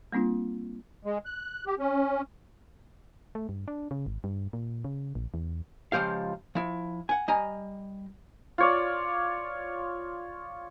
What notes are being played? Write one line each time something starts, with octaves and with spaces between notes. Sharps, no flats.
G3 A#3 C4 D4 F4
G#3
F#6
G4
C#4
A3
G2
D4
C#3
G#1
G2
A#2
C#3
A#1
E2
C#2 F#2 F3 G4 F5
F3 E4
F#5 G#5
G3 D#5 G#5 A#5
F4 C#5 D5